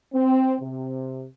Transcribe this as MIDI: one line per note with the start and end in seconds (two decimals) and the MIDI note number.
0.13 0.54 60
0.61 1.24 48